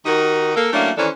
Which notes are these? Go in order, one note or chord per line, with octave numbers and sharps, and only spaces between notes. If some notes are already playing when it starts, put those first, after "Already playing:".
D#3 D#4 F#4 G4 A#4
A#3 A4 A#4
F#3 A3 A#3 C#4 D4 E4
D#3 E3 C#4 D4 A4 C5